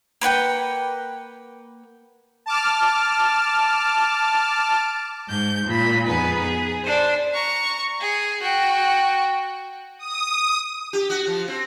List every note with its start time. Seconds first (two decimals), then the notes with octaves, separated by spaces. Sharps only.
0.21 A#3 B4 F#5 G5
2.46 A5 D6 F6
5.27 G#2 G6
5.66 A#2 B5
6.06 F2 B3 D#4 G#4 B4
6.41 G#4
6.85 D4 C5
7.33 A#5 C#6
8.01 G#4
8.41 F#4 G5
9.98 D#6
10.93 G4
11.10 F#4
11.27 F3
11.48 C4